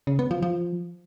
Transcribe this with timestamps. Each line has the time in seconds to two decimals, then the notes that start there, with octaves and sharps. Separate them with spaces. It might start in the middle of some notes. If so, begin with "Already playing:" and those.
0.07 C#3
0.19 B3
0.31 F3
0.42 F3